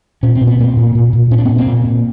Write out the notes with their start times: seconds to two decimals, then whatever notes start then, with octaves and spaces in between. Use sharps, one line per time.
0.23 A#2 C#4
0.35 C4
0.41 A#2
0.47 B3
0.59 A#2 A#3 C4
0.77 A#2
0.95 A#2
1.13 A#2
1.31 A#2 C#4
1.38 D4
1.45 B3 C#4
1.49 A#2
1.58 A#3 C4
1.67 A#2
1.85 A#2